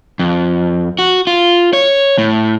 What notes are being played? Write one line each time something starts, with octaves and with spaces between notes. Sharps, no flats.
F2
F#4
F4
C#5
A2